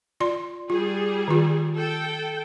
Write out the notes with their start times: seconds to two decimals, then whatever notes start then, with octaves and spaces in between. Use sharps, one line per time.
0.20 F4 D5 C6
0.70 G3 F4 G#4
1.28 D#3 F4
1.78 A4 G5